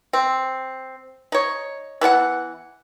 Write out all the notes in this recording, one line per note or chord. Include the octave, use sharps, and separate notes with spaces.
C4
D#4 C#5
E3 B3 A4 F#5